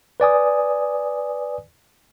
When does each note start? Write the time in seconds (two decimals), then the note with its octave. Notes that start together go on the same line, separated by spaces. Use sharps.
0.20 B4 D5 G#5 D#6